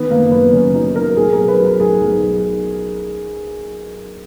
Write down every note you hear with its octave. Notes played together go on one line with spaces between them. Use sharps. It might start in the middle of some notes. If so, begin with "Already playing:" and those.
Already playing: D#3 B3
F#1 A#3
F#2 B3
F#1 C#4
F#3 D#4
F#3 A#4
B1 G#4
B1 A#4
B4
F#3
A#4
B1 G#4
B1